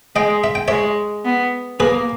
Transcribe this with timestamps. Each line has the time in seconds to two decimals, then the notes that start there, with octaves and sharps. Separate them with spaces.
0.15 G#3 D#5 G5
0.44 E5
0.55 G5
0.68 G#3 C#5 E5
1.25 B3
1.79 A#3 G#4 B4